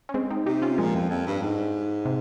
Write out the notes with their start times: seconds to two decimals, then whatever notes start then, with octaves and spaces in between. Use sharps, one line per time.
0.09 C#4
0.14 G#3 C4
0.30 C4 D#4
0.46 C3 D#4 G4
0.62 C#4 F4
0.78 A#2 F3 G#3
0.95 F2
1.10 F2
1.27 G2
1.42 G#2
2.05 C3